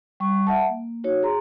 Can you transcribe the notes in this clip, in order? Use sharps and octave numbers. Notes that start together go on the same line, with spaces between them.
G3 C#6
E5 F#5 A5
A#3
D#4 F#4 C#5
G#4 A#5 C6